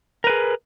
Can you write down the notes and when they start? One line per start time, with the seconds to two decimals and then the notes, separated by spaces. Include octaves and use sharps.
0.24 A#4
0.27 B4
0.30 G#4